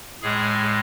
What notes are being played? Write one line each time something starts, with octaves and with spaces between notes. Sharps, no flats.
A2 G#3 G#4